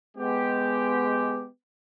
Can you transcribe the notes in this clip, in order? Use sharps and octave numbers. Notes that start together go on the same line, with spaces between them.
G#3 B3 G4